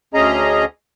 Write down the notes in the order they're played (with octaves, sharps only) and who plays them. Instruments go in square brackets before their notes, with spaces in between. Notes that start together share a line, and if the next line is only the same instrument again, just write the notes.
[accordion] D2 C#4 G#4 D#5 A#5